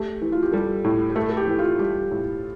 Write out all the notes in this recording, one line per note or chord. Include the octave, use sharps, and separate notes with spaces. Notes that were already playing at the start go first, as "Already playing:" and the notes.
Already playing: A3 G4
E3
F4
G4
G3 A4
A2
G4
A3 A4
A4
G4
E3
F4
G3 G4
A2